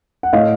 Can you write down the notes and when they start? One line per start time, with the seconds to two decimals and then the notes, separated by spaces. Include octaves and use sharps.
0.23 F#5
0.33 A2 D#5 F5